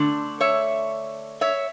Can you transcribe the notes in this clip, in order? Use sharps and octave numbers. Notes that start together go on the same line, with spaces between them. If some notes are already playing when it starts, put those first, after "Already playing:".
Already playing: D3 A3 D4
C#5 E5
C#5 E5